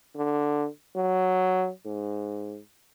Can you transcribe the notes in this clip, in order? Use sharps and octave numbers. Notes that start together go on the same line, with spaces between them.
D3
F#3
G#2